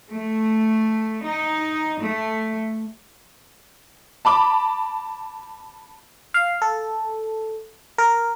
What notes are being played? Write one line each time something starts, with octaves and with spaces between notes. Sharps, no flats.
A3
D#4
A3
A5 B5 D6
F5
A4
A#4